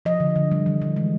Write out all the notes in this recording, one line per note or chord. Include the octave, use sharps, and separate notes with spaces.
F3 D#5
D3
D3
G3
E3
E3
G#3